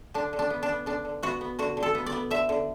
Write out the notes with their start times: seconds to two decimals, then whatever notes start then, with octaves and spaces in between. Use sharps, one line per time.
0.14 D3 D4
0.33 D3
0.39 D4
0.50 B3
0.63 D4
0.69 B3
0.86 D3 D4
1.05 D3
1.23 B3 F#4
1.41 B3
1.59 D3 F#4
1.77 D3
1.83 A4
1.95 B3
2.06 D5
2.12 B3
2.31 D3 E5
2.49 D3